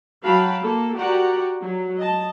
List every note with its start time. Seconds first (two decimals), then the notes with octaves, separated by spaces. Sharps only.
0.23 F#3 F#4 F5 G5 A5 B5
0.62 A#3 A4
0.96 F#4 G4 A#4 D5 F#5 A#5
1.62 F#3
1.98 D#5 A5